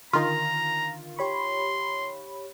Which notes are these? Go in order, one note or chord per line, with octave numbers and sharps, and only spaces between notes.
D3 D#3 F4 A#5
G4 C#5 B5 C6